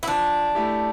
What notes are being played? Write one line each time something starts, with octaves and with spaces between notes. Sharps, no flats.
E4
F3 D4
A3 E4 G4